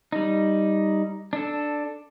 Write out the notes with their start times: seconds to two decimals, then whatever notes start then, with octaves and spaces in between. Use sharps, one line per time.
0.12 G3 D#4
1.33 D4 A4